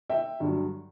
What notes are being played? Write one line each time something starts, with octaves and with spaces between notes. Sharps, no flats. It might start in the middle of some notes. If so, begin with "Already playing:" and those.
E5 G5
G2 D3 F#3